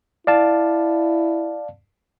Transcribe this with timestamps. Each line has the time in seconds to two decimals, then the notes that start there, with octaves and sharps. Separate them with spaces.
0.27 E4 D5 F5 A5